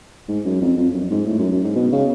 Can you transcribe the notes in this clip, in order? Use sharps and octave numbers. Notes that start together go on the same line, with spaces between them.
G#2
F#2
F2
F2
F#2
G#2
A2
F#2
F#2
G#2
B2
C#3